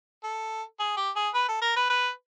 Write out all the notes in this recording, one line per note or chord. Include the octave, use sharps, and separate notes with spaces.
A4
G#4
G4
G#4
B4
A4
A#4
B4
B4